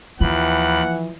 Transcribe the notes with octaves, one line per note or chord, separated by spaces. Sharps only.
D#2 E3 F3 F#5 B5